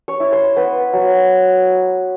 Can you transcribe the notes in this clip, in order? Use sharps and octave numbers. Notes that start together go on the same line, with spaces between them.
C#5
E4
C5
B3 B4
F#3